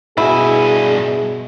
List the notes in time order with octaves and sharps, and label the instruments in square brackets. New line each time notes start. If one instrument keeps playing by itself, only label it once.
[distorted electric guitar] G2 G#5 [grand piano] B2 D#5 [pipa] E4 [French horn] G#4